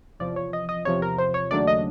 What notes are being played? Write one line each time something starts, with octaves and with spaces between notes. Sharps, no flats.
E2 C3 F3 D5
C#5
D#5
D#5
E2 C3 F3 C#5
A#4
C5
C#5
D#2 C#3 F#3 A3 D4 D5
D#5